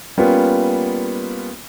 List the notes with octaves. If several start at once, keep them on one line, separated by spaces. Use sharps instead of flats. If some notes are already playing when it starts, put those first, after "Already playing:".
G3 A#3 B3 C#4 F4